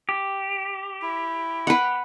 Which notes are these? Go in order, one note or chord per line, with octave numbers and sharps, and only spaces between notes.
G4
E4
B4 F#5